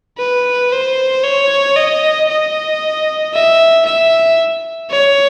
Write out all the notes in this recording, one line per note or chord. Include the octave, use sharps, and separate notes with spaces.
B4
C5
C#5
D#5
D#5
E5
E5
C#5